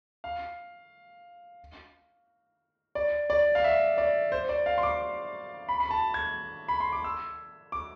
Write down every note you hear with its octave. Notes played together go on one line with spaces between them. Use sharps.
F5
D5
D5
F5
E5
D5
C5
D5
F5
C6
D6
B5
B5
A5
G#6
B5
C6
D6
E6
D6